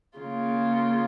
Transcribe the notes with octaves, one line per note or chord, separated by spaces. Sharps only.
C#3 A#3 F4